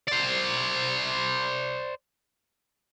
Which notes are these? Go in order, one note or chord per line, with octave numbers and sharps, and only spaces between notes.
C5 D5